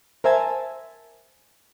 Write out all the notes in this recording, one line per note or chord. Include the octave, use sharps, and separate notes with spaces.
A#4 C5 E5 G#5 A5